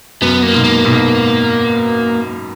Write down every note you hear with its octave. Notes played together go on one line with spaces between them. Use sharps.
F#2 B3
A#3
G#2 B2
A#3
G#2 B2